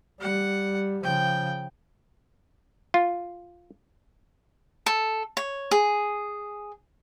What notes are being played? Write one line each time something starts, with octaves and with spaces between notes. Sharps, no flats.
G3 F#5
C#3 F3 G5
F4
A4
C#5
G#4